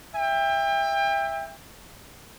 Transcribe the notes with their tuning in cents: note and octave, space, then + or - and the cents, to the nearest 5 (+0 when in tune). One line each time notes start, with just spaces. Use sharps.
E5 +0 G5 +30